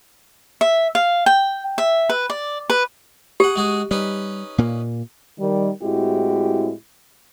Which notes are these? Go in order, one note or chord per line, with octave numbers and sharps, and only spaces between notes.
E5
F5
G5
E5
B4
D5
B4
G4 G#4 F#5
G#3 F#4 G#4
G3 C#4 D#4 B4
A#2 A#3
D#3 G3
A2 G#3 C4 E4 F#4 G4